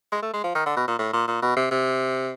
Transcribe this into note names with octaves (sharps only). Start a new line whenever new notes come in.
G#3
A3
G#3
F3
D#3
D3
B2
A#2
A2
A#2
A#2
B2
C3
C3